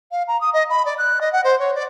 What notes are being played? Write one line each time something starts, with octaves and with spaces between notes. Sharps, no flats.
F5
A#5
D#6
D#5
B5
D5
F#6
D#5
F#5
C5
C#5
D5